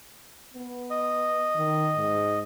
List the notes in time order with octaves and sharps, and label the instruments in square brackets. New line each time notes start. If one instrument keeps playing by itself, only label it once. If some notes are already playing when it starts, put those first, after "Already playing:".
[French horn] B3
[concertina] D#5
[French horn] D#3
G#2